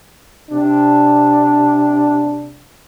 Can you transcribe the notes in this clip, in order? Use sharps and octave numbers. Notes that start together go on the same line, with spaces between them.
C3 D4